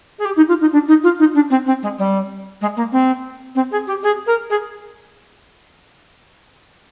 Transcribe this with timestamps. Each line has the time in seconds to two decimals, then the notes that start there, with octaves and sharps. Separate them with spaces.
0.19 G#4
0.25 G4
0.37 D#4
0.48 F4
0.61 D#4
0.72 D4
0.88 D#4
1.03 F4
1.19 D#4
1.35 D4
1.50 C4
1.66 C4
1.83 G#3
1.98 G3
2.61 G#3
2.77 A#3
2.92 C4
3.55 C4
3.72 G#4
3.87 G4
4.03 G#4
4.27 A#4
4.50 G#4